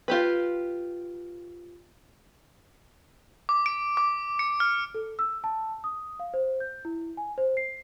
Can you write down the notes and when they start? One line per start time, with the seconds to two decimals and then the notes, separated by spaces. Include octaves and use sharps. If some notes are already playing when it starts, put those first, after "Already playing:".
0.08 F4 G4 B4
3.49 D6
3.66 D7
3.97 D6
4.39 C#7
4.60 F6
4.95 A4
5.19 E6
5.44 A5
5.84 D#6
6.20 F5
6.34 C5
6.60 G6
6.85 E4
7.17 G#5
7.38 C5
7.57 C7